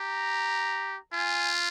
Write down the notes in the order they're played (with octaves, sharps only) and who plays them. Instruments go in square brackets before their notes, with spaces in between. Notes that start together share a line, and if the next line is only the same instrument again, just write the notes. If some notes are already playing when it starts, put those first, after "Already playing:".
Already playing: [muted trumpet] G4 [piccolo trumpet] A#5
[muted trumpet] F4 [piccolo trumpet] G#5